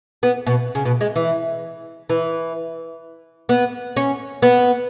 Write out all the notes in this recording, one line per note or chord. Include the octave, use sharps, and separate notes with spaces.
B3
B2
C#3
B2
G#3
E3
E3
B3
C#4
B3